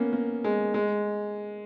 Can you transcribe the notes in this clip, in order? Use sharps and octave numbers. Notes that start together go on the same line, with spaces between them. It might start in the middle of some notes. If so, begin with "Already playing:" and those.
Already playing: A#3 B3 C#4
A#3
G#3
G#3